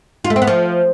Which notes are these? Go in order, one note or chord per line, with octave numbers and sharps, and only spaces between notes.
F4
A3
C4
B3
F3